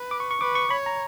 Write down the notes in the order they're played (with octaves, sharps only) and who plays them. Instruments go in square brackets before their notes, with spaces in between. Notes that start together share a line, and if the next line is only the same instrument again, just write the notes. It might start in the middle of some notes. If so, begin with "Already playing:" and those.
Already playing: [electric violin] B4
[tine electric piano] D6
C#6
C#6
[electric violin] B4 [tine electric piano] D6
[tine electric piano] C#6
[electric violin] C#5 [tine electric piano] B5
[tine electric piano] A#5